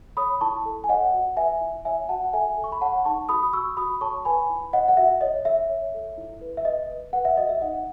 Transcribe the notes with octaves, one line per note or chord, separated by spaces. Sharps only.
C#5 B5 D#6
E4 A5 C#6
A4
G#5
C#5 D#5 F#5
F#4
B4 E5 G#5
E4
C#5 E5 G#5
F#4 F#5 A5
A4 E5 G#5
A4
C#6
B5
C#5 F#5 A5
D#4 A5 C#6
F#4 B5 D#6
D#6
F#4 C#6 E6
F#4 B5 D#6
C#5 A5 C#6
B4 G#5 B5
E4
C#5 D#5 F#5
F#5
F#4 E5
C#5 D#5
C#5 E5
C#5
A4
E4
B4
E5
B4 D#5
B4
B4 F#5
E5
F#4 D#5
E5
D#4 D#5 F#5